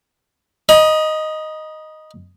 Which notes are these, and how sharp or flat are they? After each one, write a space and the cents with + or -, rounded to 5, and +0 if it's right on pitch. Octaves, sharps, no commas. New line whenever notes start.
D#5 +0 A#5 +45